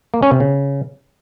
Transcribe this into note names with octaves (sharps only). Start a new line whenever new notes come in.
A#3
C#4
C3
C#3